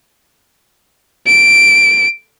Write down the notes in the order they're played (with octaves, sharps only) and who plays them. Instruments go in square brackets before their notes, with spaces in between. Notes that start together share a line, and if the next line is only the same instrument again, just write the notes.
[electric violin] D7